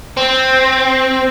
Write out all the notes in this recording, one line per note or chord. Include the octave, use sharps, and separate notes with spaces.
C4